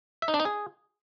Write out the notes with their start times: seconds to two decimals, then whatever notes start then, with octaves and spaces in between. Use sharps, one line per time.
0.22 E5
0.28 D#4
0.34 D4
0.40 D#4
0.45 G#4